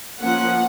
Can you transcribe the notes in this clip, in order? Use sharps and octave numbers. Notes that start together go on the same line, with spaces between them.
F3 A#3 C#4 F#5